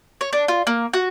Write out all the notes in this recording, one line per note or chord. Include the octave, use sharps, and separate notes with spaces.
C#5
D4
F4
A#3
F#4